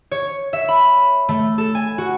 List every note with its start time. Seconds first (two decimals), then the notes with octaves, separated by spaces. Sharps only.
0.11 C#5
0.53 E5
0.69 B5
1.29 A3
1.58 A4
1.75 G#5
1.98 F#4